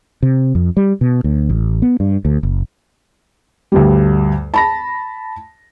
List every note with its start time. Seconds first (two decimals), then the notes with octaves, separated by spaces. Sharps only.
0.23 C3
0.55 F2
0.77 G3
1.01 B2
1.24 D2
1.49 A1
1.82 B3
2.00 G2
2.25 D2
2.43 F#1
3.72 D2 G2 G3
4.54 A5 B5 A#6